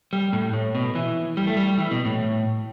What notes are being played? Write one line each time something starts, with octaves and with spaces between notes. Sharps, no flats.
G3
A2
A2
B2
E3
G3
A3
G3
G3
E3
B2
A2